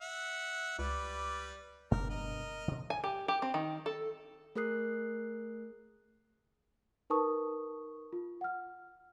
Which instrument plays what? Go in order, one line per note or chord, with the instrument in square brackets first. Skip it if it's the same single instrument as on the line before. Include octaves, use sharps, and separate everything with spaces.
[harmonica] E5 F#5
[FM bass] C#2 [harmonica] G3 B4 D5
[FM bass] F#1 [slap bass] G2 B2 D4 [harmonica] A#4
[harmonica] A#4 D#5
[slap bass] B2 D3
[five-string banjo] G#5
G4
G4
C4
D#3
A4
[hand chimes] A3 G#4 A#4 D#6 F#6 C7
[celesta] D#4 A#4 B4 A5 C#6 D#6
F4
F#5 F6